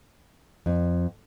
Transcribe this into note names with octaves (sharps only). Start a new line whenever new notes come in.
F2